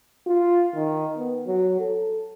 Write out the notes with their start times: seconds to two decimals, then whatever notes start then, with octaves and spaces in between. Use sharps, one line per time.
0.27 F4
0.74 D#3
1.17 B3
1.47 F#3
1.80 A4